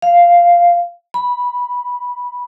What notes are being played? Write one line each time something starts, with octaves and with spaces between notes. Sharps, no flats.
F5
B5